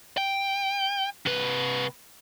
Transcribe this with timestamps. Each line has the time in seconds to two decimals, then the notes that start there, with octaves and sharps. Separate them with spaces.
0.17 G5
1.26 C3 B4